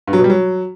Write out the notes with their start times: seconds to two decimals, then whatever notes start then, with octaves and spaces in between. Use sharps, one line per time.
0.07 G2
0.13 F#3
0.19 B2
0.24 G3
0.30 F#3